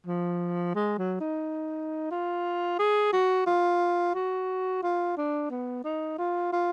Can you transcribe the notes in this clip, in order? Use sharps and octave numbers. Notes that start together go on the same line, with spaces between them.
F3
G#3
F#3
D#4
F4
G#4
F#4
F4
F#4
F4
D4
B3
D#4
F4
F4